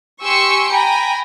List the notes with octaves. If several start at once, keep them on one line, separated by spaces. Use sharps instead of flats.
G4 G#5 C6 C#6 E6 C#7
G5 G#5 A#5 B5